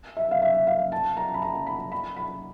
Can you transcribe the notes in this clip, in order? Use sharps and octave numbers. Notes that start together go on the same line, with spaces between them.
E5
F5
E5
F5
A5
A#5
B5
A#5
B5
B5
B5